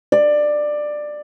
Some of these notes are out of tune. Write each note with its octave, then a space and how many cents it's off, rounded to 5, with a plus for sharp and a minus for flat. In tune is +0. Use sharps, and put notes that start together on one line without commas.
D5 +15